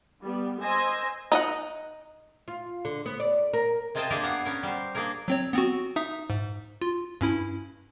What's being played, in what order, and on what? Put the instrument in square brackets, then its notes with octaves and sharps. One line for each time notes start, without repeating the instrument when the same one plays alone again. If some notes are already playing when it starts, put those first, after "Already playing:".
[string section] G3 B3
C5 D#5 G#5 E6 G#6 A#6
[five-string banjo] D#4 D#5 F#5
[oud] F4
D3
B3
D5
A#4
[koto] C3 G#3 F4 D#5 G5 A5
A#3 D4 G4 G#4 A#4
B3 F5 F#5
B3 C#4 A#4
G3 C5
A#3 D4 G#4 A#4
[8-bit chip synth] F#3 C4 C#5
B3 C4 F#4
D#4 E5 D#6
G#2
F4
G2 C#4 E4